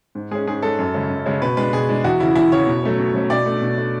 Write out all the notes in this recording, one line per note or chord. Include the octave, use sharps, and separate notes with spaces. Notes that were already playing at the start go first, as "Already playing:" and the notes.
G#2
G#3 C#4 G#4
G#2 G#4
G#3 C#4 A4
F#2
C#3 G#3 C#4
F#2
C#3 G#3 C#4
B2 B4
G#3 D4 B4
B2 G#4
G#3 D4
E2 F#4
C#3 E3 E4
E2 E4
C#3 E3 C#5
B2
F#3 A3 C#4
B2
F#3 A3 C#4
B2 D5
A3 D4
B2
A3 D4